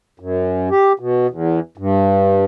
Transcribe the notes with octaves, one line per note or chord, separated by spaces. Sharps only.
F#2
G4
B2
E2
G2